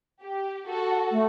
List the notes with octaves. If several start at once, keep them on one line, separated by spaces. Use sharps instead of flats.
G4
F#4 A4
A3